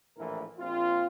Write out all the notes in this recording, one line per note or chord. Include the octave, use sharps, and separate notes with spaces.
A#1 A2 E3 E4 A#4
A#1 C4 F4